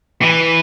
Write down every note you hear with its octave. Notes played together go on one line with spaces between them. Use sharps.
E3